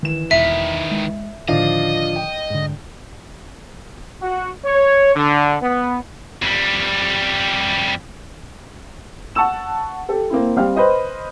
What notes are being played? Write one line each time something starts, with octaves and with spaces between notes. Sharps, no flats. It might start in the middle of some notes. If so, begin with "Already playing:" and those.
D#3 E3 E7
E1 D#3 B4 E5
G#3
A2 D3 D#3 F3 D4 D#5 F5
G5
G#2 D3
F#4
C#5
D3
B3
F2 G3
F#5 A5 C#6 E6 E7
G4 A4
A#3 C4 E4
G3 C4 F5 G5 F6
B4 C5 D#5